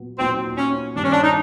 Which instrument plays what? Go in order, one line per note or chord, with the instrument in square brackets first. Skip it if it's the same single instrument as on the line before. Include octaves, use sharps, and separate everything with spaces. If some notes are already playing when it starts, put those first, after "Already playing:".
Already playing: [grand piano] A#2 F#3 B3
[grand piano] A#2 F#3 B3 D#4 [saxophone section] C4
[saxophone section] C#4
[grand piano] G2 D#3 G3 C4 [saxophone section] D4
[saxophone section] C#4
D4
D#4